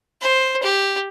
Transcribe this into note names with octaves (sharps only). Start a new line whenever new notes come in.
C5
G4